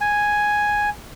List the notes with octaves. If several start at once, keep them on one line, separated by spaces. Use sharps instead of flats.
G#5